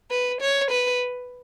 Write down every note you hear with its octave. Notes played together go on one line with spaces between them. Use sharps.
B4
C#5
B4